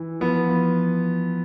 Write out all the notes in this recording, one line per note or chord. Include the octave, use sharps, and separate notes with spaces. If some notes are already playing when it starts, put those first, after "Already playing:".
Already playing: E3
F3 B3
F3